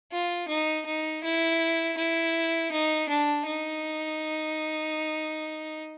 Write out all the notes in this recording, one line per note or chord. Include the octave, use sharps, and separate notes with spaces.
F4
D#4
D#4
E4
E4
D#4
D4
D#4